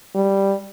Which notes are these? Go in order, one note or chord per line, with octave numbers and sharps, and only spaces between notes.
G3